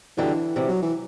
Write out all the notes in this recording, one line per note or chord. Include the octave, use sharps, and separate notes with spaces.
F#2 D3 E3 G3
D2 C3 E3 G3
F#3
E3